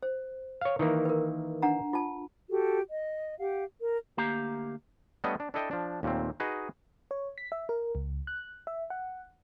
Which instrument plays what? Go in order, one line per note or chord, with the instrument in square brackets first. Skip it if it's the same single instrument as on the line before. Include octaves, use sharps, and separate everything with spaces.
[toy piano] C5
[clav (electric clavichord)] C#5 F5
D#3 E3 A#3
[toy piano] A#4 B4
D4 F#5 A#5
F4 A5
[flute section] F#4 G4 A4
D#5
G4 F5 F#5
A#4
[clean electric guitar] D2 A#3 G4 F5 A#5
[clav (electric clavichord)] G3 A3 B3 D4 C#5 D#5
D4
D4 E4 A4 D#5 G5
F3 D4
D#2 A#2 A3 C4
D#4 F#4 G#4 B4 D#5
[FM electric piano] C#5
B6
E5
A#4
C#2
F#6
E5
F#5